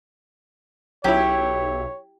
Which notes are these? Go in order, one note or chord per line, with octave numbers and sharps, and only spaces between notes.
B1 F#3 C#4 E4 G4 C#5